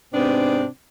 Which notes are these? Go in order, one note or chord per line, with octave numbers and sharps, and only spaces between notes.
G#2 C3 B3 C4 D4